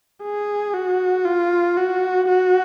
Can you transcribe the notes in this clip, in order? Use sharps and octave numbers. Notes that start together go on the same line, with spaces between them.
G#4
F#4
F4
F#4
F#4